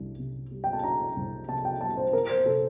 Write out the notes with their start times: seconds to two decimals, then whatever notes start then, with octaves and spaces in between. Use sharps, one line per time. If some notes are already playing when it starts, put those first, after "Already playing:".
Already playing: C2 D4
0.19 C3
0.51 G3
0.64 G5
0.73 A5
0.84 D4 A#5
1.16 C2
1.48 C3 A5
1.65 G5
1.81 G3 A5
1.97 C5
2.13 C4 A#4
2.29 C5
2.45 C3 A4